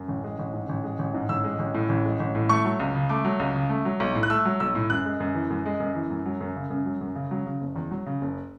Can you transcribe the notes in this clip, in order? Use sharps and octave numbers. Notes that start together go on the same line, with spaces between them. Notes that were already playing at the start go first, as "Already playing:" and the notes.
Already playing: F#2
A1
G#3
A1
G#2
A1
G#3
A1
G#2
A1 E6
G#3
A1
A2
A1
G#3
A1
A2
A3 C#6
F#3
C#2
C#3
A3 D6
F#3
C#2
C#3
A3
F#3
B1
A2
F#6
A3 E6
F#3
B1 E6
A2
F#2 F#6
G#3
F#2
E3
F#2
G#3
F#2
E3
F#2
F#3
F#2
C#3
F#2
F#3
F#2
C#3
F#3
C#3
F#1
E2
F#3
C#3
F#1